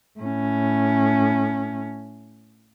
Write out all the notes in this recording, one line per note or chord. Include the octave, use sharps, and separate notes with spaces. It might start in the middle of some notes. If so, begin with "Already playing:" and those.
A2 C#4